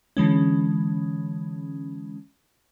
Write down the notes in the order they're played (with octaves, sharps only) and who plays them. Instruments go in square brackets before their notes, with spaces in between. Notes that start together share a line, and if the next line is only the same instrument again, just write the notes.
[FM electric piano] D3 E3 G#3 C#4